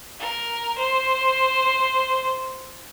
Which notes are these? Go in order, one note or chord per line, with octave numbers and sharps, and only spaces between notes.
A#4
C5